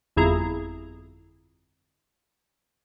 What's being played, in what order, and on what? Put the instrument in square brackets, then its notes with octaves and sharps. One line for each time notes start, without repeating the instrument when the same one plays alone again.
[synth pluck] G1 F2 E4 G#4 A#5